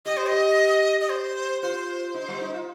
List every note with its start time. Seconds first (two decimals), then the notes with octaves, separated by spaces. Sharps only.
0.05 G4 D#5
0.17 C5
0.28 G4 D#5
1.00 D#5
1.10 C5
1.62 F4 C5
2.14 D#4
2.28 G3
2.41 D#4
2.54 F4